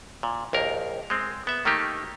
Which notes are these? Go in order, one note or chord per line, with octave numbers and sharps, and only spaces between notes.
A#2
A#1 D#2 A#4
G#3 C4
B3 E5
D#3 A3 A#3 D#4 G4